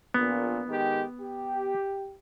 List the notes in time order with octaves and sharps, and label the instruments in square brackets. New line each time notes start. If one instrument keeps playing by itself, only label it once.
[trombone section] A#1 A#2 [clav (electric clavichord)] B3
[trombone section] D#3 G#3 G4
G4